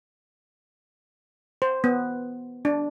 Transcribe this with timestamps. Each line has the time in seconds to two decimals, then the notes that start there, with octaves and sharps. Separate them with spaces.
1.62 C5
1.84 B3
2.65 D4